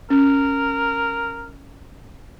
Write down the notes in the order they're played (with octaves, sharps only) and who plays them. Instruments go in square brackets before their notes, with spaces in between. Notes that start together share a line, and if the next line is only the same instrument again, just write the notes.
[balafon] C#4 [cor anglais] A#4